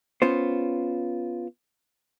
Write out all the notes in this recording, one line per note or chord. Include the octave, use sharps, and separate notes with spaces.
B3 C#4 F4 C5